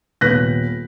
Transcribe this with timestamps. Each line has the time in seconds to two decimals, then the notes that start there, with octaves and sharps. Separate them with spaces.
0.21 D#1 B3 F#6 A#6 B6